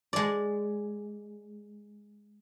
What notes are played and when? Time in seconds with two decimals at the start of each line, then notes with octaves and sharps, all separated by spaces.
0.13 G#3 D5